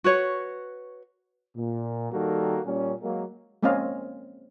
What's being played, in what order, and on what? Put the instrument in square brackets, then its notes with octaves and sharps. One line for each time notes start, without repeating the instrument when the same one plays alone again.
[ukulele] F#4 B4 C#5
[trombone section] A#2
D#3 G3 A#3 F#4 A4
A#2 G3 C#4
F#3 G#3 A#3
[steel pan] G#3 A#3 C4 C#4 D#5 F5